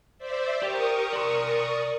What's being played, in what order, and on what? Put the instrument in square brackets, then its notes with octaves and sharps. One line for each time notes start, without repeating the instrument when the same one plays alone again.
[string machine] C5 D5 E5
[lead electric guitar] G4 [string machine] A#4 C#6 D#6
[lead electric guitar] D5 C6